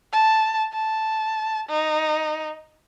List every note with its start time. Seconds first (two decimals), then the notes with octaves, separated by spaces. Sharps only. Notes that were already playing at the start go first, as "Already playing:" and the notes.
0.12 A5
0.72 A5
1.69 D#4